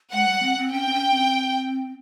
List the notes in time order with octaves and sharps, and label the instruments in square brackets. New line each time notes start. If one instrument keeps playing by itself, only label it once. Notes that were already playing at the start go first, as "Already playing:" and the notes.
[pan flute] G#3 [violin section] F#5
[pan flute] G3
C4
C4
[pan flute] C#4 [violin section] G5
[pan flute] C4
C#4
C4